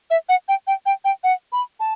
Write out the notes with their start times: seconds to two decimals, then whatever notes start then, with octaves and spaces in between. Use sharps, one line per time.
0.11 E5
0.29 F#5
0.49 G5
0.67 G5
0.86 G5
1.05 G5
1.24 F#5
1.52 B5
1.80 A5